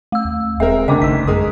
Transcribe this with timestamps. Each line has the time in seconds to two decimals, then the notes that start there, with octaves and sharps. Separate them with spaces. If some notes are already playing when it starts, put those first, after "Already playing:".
0.12 A3 E6
0.25 D#2
0.60 D1 G#3 C4 A#4 E5
0.88 F#1 D2 C#3 D#5 G5 D6
1.02 A1 D#3 E6 B6
1.27 F#2 G#3 A#4 D#6